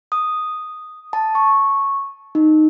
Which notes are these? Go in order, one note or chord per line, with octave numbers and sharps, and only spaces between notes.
D#6
A5
C#6
D#4